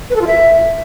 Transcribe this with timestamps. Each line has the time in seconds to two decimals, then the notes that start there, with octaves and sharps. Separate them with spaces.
0.10 B4
0.16 A4
0.21 F4
0.27 E5